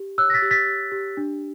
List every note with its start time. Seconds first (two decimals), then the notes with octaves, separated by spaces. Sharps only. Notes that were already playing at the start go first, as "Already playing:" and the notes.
Already playing: G4
0.18 C#5 E6 F#6
0.30 A#6
0.34 A6 B6
0.42 G4
0.51 A6 B6
0.67 G4
0.92 G4
1.17 D4